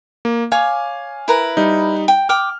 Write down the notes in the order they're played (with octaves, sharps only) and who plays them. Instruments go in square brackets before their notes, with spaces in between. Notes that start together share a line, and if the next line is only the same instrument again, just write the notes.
[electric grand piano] A#3
[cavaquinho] C#5 D6 [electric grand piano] F5 G#5
[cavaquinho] E4 A#4 B4
[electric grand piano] G3 D#4
[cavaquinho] G5
[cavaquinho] G5 D6 D#6 [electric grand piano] F6